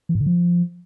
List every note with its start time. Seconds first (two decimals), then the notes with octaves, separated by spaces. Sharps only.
0.09 E3
0.15 G#2
0.21 D3
0.26 F3